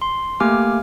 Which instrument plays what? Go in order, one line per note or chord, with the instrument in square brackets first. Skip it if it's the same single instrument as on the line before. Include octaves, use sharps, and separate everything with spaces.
[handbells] C6
A3 A#3 G4 G#5 D6 F6